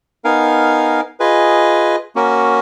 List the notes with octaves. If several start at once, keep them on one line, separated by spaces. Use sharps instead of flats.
B3 D#4 A#4 F5 G#5
F4 G#4 B4 D#5 G#5
A#3 C#4 F#4 A#4